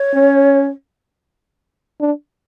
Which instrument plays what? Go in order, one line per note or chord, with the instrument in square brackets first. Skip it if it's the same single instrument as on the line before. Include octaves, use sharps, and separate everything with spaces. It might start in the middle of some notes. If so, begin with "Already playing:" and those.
Already playing: [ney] C#5
[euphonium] C#4
D4